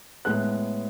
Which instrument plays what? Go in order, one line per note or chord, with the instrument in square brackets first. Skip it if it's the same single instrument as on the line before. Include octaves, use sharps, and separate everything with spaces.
[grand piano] A2 G#3 B3 F#6